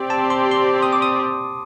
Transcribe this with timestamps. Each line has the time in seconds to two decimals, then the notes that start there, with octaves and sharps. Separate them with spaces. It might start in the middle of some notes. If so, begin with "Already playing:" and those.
Already playing: C4 G4 D5
0.10 A5
0.30 C6
0.51 C6
0.83 D#6
0.92 D6
1.02 D#6